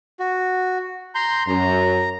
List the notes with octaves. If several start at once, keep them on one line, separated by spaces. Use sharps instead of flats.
F#4
A#5 C6 G6
F#2 A#5